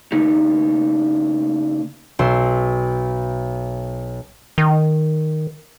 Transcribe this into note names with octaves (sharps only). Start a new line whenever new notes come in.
C#3 A#3 D#4 G4
B1 C6 E6
D#3